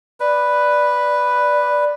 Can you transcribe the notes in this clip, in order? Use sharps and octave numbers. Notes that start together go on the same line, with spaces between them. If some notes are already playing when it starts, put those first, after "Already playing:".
B4 D5